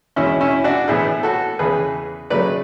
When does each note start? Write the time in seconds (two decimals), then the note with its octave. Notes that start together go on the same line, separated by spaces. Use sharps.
0.16 E2 B2 G#3 C#4 E4
0.41 C#4 E4
0.64 D4 F#4
0.88 A2 E3 B3 E4 G#4
1.23 F#4 A4
1.59 E2 C#3 E3 G#4 B4
2.30 C#3 F#3 A3 B4 D5